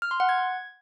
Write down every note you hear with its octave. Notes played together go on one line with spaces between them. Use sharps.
F6
C6
F#5
G#6